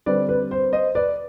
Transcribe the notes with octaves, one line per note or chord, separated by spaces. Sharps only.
D3 G3 C4 B4 D5
B4
C5
C5 D#5
B4 D5